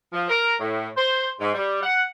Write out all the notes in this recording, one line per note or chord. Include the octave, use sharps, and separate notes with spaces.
F3
A#4
A2
C5
G#2
G3
F#5